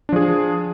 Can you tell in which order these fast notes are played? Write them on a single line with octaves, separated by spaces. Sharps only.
D4 F3 G#4